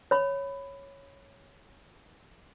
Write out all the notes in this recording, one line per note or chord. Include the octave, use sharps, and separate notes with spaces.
C#5 B5